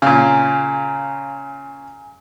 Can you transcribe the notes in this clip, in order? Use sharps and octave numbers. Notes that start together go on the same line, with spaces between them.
A#2 C#3 G#5